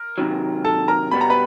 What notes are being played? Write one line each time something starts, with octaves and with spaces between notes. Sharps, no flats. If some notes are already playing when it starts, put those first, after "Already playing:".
Already playing: A#4
C3 D#3 F#3
A4 A5
A#4 A#5
B2 G3 B3 B5
A#5
B4 B5